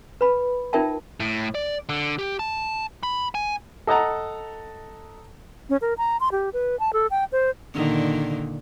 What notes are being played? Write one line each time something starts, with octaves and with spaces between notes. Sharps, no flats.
B4 B5
D#4 F4 A#4 E5 G5 A5
A2
D5
D3
G4
A5
B5
G#5
A4 D#5 F#5 A5 A#5
C#4
A#4
A#5
C6
G4
B4
A5
A4
G5
C5
A#2 D3 D#3